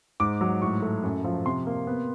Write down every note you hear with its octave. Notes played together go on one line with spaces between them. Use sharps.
G#2 D6
F#3
A2 C#6
A3
F#2
F3
C3 C6
A#3
B3